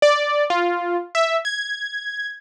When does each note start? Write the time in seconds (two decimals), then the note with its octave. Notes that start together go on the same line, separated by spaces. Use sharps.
0.02 D5
0.50 F4
1.15 E5
1.45 G#6